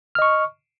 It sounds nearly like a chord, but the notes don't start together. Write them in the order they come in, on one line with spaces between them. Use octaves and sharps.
F6 D#5 C#6